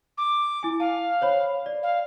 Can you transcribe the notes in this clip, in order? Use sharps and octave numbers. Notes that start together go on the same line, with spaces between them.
D6
E4 G#5
F5 A5
C5 C#5 B5
D5
F5